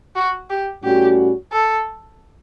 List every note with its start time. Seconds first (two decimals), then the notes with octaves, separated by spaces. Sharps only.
0.16 F#4
0.50 G4
0.84 A2 G3 C#4 F#4 G4
1.52 A4